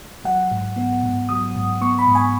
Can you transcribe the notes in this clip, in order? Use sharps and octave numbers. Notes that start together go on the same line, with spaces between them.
F#3 F#5
G#2
B3
G#2
F#3 D#6
G#2
B3 C#6
B5
G#2
G#5